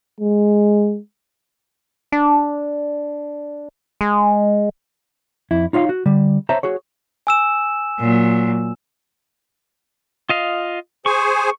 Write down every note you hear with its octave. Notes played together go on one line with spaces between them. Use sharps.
G#3
D4
G#3
F2 E4
D#4 F4 C#5 E5 F5
F#4
D3 G3
C5 C#5 E5 A5 A#5
F#4 G#4 C#5
G#5 E6 E7
A#2 F#3
F4 D#5 F5
G#4 C5 G#5 C#6